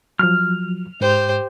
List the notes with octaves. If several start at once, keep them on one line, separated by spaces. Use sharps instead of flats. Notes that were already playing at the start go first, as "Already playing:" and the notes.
F3 F#3 F6
G#2 G4 C5